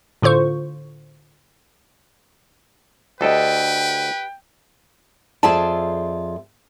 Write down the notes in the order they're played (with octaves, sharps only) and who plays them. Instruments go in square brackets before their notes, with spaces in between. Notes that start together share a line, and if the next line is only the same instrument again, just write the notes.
[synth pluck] A2 D3 F4 C5 C#6
[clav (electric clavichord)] D2 A4 [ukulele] G4 D#5 [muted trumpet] B4 [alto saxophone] G5
[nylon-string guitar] F2 F4 G#4 D5 E5 A5